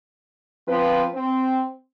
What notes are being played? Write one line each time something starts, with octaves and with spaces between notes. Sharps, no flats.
F3 B3 C4 F4 B4
C4